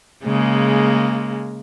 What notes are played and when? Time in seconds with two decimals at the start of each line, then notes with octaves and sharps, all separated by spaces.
0.24 C#3 G#3 A#3